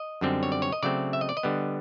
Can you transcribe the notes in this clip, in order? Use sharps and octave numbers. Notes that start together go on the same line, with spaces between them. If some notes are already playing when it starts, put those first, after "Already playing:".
Already playing: D#5
F#2 D3 G3 C4
C#5
D5
C#5
D#5
C#3 F#3 A3 C4 D5
E5
D#5
D5
D#5
D3 G3 B3